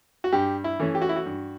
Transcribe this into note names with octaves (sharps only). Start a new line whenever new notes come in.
F#4
G2 G4
E4
E3 A3 C#4
G4
F#4
E4
F#4
G2